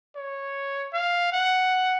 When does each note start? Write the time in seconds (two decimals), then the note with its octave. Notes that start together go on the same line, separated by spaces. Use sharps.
0.16 C#5
0.93 F5
1.33 F#5